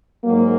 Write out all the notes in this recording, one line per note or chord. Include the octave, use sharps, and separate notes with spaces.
G#2 F#3 A#3